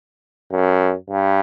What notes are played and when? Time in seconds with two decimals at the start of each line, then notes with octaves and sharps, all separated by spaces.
0.51 F#2
1.10 G2